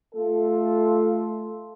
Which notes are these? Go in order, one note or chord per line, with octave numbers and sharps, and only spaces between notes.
A3 F4 A4